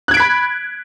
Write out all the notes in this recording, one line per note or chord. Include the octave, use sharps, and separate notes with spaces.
B5 F#6 G#6 B6 D7